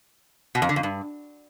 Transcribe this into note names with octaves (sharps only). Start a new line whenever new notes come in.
B2
F2
D3
F2
G2